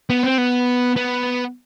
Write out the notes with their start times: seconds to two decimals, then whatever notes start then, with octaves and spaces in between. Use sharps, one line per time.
0.10 B3
0.23 C4
0.38 B3
0.96 B3